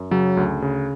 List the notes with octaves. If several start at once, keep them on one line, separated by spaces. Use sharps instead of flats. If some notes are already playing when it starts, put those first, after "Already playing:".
Already playing: F#2
C#3 F#3
D2
C#3